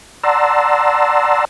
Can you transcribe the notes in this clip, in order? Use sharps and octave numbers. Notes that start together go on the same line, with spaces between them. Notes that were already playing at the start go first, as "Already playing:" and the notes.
D5 F#5 A5 A#5 C6 E6